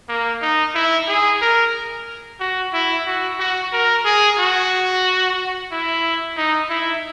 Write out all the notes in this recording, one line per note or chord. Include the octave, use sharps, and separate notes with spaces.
A#3
D#4
E4
G#4
A#4
F#4
E4
F#4
F#4
A#4
G#4
F#4
E4
D#4
E4